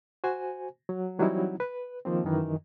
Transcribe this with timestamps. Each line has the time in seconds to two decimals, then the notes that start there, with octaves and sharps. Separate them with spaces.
0.24 F#4 C5 G#5
0.89 F#3
1.19 E3 F#3 G3 C4 D#4 E4
1.60 B4
2.05 D#3 F3 A#3 C4
2.24 F#2 D#3 E3